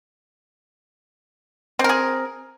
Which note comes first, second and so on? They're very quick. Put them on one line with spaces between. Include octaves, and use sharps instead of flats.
C4 A#4 G#4